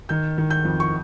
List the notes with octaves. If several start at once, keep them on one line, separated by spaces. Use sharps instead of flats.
D#3 G6
D#3
G6
F2
C#6